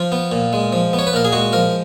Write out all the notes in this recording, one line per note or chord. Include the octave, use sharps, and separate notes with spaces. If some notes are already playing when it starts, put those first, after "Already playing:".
Already playing: F3 F4
B3
A#2
G#3
F3
B3
C#5
B4
A#2 A#4
G#4
G#3 F#4
F3 A#4